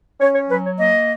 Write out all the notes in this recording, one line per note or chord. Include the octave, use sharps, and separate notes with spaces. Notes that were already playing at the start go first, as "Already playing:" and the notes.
C#4 C#5
C#5
F#3 B4
C#5
A#3 D#5